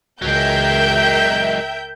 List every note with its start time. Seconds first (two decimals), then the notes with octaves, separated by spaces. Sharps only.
0.22 C#2 F#3 G#3 A#4 E5 G5 G6